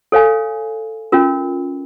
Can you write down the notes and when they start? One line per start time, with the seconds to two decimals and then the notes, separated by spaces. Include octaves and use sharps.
0.12 A4 C#5 F5 G#5
1.12 C#4 F4 A#4